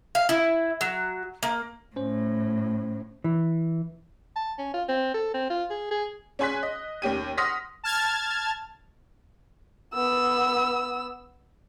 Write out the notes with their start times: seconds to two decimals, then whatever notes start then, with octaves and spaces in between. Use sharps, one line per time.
0.15 F5
0.29 E4
0.81 F#3
1.43 A#3
1.96 A2 C#4 C5
3.24 E3
4.36 A5
4.58 C#4
4.74 F4
4.88 C4
5.14 A4
5.34 C4
5.50 F4
5.70 G#4
5.91 G#4
6.39 C#4 G#4 G#5 C6 F#6 B6
6.63 D#5
7.02 D#2 C#4 G4 D#7
7.38 F#5 C6 D#6 F6 A#6 B6
7.84 A5 F6 G#6 A6
9.94 B3 E6